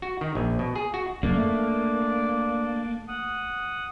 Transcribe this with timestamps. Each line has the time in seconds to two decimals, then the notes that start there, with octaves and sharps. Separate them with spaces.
0.02 F#4
0.21 D#3
0.35 A#1
0.59 B2
0.76 G#4
0.94 F#4
1.23 D1 F#2 C#3 A#3 D4 D5
1.35 A3
3.08 F#5 D#6